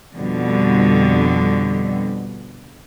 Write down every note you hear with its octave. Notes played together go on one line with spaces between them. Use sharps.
F2 B2 D3 G3